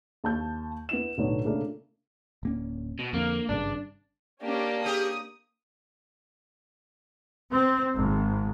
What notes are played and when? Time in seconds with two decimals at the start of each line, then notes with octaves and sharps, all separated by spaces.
0.24 D#2 A5 G6
0.89 B3 E4 E7
1.18 B1 A2 D3 B3 D#4 C#5
1.44 A#2 C#3 A3 A#3 D4
2.43 D1 A#3 C#4
2.99 B2
3.13 F2 D3 A#3
3.49 G#1 G2 C#3 D4
4.43 A#3 C#4 D4 G4
4.85 C#4 G4 G#4 D#6
7.53 C4
7.97 G#1